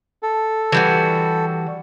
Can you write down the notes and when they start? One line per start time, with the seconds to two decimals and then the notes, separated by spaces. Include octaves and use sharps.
0.23 A4
0.72 E3 G3 F#4